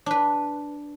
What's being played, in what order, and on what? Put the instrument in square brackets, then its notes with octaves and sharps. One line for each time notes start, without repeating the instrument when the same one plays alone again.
[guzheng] D4 B4